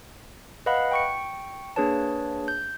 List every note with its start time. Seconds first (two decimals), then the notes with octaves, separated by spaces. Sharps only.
0.66 B4 D#5 F5 F#5 B5 F#6
0.91 G5 C#6 C#7
1.76 A#3 D4 G#4 B4 C#5 A5
2.48 G6